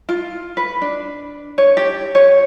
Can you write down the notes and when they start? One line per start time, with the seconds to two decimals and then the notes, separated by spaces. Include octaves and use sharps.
0.09 F4
0.57 B4
0.82 D4
1.58 C#5
1.77 G4
2.15 C#5